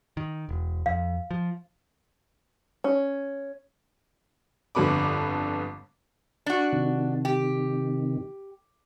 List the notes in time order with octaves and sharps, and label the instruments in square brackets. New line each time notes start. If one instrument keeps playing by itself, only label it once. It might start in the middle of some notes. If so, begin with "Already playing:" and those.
[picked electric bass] D#3
E1
[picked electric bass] F2 [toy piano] F5
[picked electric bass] F3
[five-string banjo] C#4
[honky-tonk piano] G1 F2 D3 B3 B5 D6
[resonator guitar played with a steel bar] D4 F#4
[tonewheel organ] C3 D#3
[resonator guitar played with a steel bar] G4